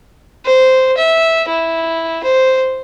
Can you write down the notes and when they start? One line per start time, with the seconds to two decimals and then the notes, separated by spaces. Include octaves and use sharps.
0.45 C5
0.97 E5
1.48 E4
2.23 C5